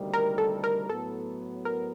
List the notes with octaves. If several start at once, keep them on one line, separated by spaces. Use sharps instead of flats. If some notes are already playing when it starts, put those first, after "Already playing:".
Already playing: D2 C3 D#3 G3 A#3
A#4
A4
A#4
A2 F#3 B3 A4
A#4